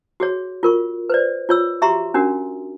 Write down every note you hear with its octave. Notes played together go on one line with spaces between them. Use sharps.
F#4 G#4 C#5
F4 A#4 C#6
B4 C5 D5
F4 C#5 E6
F#4 G4 E5 A#5 C6 C#6
C#4 D4 F#4 A#4